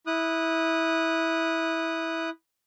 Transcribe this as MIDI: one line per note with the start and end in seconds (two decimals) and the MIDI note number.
0.07 2.30 64
0.07 2.30 87
0.07 2.30 90